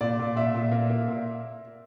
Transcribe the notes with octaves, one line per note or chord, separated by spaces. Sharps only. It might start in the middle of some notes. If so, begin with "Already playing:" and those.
A#2 D5
A#2
A#2 E5
A#2
A#3
A#3
A#2